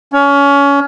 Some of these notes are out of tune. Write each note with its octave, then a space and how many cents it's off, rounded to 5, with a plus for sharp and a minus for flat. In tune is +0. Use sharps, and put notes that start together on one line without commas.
C#4 +25